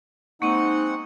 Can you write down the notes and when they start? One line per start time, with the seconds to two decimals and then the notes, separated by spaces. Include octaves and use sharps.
0.42 G#3 A#3 C4 D#4 F#5 C#6 D#7